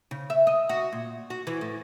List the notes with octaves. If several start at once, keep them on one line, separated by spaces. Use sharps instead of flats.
C#3
E5
D#5
F#4
A#2
F#4
E3
A2